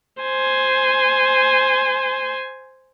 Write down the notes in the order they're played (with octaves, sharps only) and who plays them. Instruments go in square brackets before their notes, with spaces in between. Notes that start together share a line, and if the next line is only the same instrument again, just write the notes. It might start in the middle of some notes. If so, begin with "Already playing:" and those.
[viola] C5 G#5